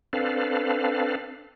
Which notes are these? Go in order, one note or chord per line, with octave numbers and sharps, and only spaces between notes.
C4 D4 A4 B4 F5